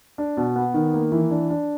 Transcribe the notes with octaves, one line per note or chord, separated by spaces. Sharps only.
D4
B2
B3
D#3
A#3
E3
D4
D4